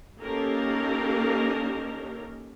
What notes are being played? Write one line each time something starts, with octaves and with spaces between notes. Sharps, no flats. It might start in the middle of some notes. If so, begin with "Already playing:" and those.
A#3 C#4 D#4 G4 A4 A#4